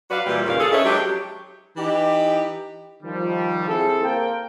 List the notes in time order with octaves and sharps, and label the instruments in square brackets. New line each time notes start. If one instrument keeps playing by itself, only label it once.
[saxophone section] F#3 F#4 B4 D5 F5
A#2 E3 G3
D#2 A#2 C#3 A#4 F5
G#4 A4
C#4 D#4 E4 B4 C#5
F#3 G#3 D4 G4
[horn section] E3 D#4 G4
[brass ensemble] D#3 F3 G3
C4 E4 G#4 A4
A#3 A#4 C5 F5 G5